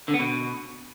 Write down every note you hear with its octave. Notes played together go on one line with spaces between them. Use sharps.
D3
B3
B2